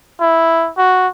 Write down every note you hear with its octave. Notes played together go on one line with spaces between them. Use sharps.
E4
F#4